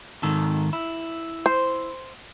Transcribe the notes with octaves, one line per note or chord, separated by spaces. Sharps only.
G#2 D#3 A4
E4
C5